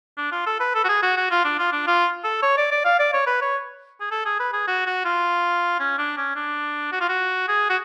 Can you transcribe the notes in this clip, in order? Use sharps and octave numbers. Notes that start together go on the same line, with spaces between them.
D4
F4
A4
B4
A4
F#4
G#4
F#4
F#4
F4
D4
F4
D4
F4
A4
C#5
D5
D5
F5
D5
C#5
B4
C#5
G#4
A4
G#4
B4
G#4
F#4
F#4
F4
C#4
D4
C#4
D4
F#4
F4
F#4
G#4
F#4